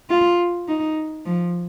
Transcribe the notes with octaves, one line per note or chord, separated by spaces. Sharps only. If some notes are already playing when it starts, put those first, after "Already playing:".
F4
D#4
F3